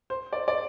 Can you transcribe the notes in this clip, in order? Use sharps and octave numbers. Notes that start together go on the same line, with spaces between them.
C5
D5
D5